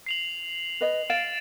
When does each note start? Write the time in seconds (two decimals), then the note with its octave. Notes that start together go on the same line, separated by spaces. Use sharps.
0.06 C7 F7 F#7
0.81 B4 D#5
1.10 F5 A6 D7 E7